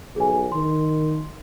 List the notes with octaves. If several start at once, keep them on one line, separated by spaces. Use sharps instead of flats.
B1 G#4 G#5
D#3 C6